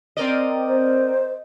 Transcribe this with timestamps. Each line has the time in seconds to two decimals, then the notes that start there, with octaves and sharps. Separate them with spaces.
0.17 C4 A#4 D5 D#5
0.65 C5